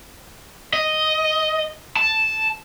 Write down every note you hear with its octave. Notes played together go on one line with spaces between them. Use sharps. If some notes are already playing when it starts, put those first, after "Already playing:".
D#5
A5